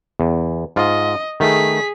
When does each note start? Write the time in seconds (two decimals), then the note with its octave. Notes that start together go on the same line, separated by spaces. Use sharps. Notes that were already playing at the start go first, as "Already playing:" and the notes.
0.20 E2
0.76 G#2 F4 D#5
1.40 D#3 A3 G#4 B6